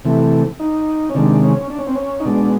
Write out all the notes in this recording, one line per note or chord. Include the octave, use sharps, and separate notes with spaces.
C3 E3 A3
D#4
C#4
C3 D#3 G#3 D4
C#4
D4
C#4
C4
C#4
D#4
B2 G#3 D4